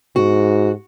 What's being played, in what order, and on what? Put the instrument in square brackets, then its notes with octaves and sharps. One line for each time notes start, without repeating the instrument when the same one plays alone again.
[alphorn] G#2 [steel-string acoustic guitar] F#4